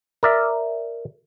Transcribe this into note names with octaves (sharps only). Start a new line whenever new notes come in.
A#4 D5 E5